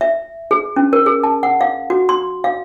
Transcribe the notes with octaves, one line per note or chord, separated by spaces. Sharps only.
E5
G#4
C#4
A#4
G#4
A5
F#5
F5
F#4
C6
F5